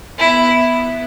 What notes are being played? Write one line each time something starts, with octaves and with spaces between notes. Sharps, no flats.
B3 E4